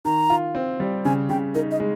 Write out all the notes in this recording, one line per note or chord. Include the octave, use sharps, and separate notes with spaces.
D#3 A#5
F4
C4
G3
C#3 G#5
C#3 G5
D#4 A#4
D#5
G#3